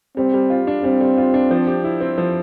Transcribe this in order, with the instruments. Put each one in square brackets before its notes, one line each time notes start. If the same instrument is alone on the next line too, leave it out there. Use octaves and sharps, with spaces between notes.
[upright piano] G3 [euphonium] C4
[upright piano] G3
F4
D4
[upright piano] G3 [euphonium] C4
[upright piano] G3
F4
D4
F3
G4
E4
C4
F3